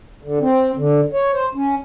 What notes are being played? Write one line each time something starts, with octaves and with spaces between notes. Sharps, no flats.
D3
C4
D3
C#5
C5
C#4